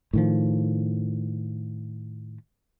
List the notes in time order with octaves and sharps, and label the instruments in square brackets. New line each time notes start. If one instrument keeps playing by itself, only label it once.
[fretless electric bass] A2 D#3 F3